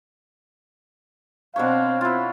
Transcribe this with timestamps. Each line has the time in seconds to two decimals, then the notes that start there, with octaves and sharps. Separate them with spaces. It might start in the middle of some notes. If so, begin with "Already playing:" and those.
1.56 B2 C4 D4 C5 C#5 F5
2.01 E4 F4